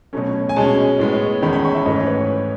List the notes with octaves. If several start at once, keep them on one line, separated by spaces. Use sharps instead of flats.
B2 F#3 A3 C#4
G#5
B2 G#3 C#4 A5
A2 G#3 B3
E2 D#3 G#3 C#4 B5
B5
C#6
E5
G#2 E3 A3 C#4 D#5
C#5
B4